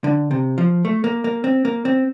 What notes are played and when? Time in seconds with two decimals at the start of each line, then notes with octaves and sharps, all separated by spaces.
0.04 D3
0.31 C3
0.58 F3
0.85 A3
1.04 A#3
1.24 A#3
1.44 C4
1.65 A#3
1.85 C4